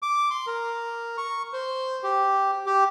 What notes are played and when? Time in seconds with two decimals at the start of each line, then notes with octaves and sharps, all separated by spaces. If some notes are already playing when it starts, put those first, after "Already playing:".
0.02 D6
0.30 C6
0.47 A#4
1.18 C#6
1.53 C5
2.03 G4
2.66 G4